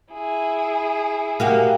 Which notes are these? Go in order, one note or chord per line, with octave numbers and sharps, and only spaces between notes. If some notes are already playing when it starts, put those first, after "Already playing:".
E4 G#4
A#3 F#4 G4